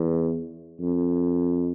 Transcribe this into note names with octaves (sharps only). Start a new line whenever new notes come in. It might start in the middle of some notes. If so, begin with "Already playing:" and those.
Already playing: E2
F2